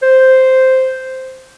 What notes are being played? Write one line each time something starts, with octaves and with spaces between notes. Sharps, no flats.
C5